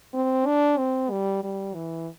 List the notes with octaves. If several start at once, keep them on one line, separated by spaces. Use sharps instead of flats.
C4
D4
C4
G3
G3
E3